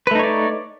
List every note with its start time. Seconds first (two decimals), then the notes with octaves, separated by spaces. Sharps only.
0.07 B4
0.11 A3
0.15 D#4
0.19 C#5
0.23 D5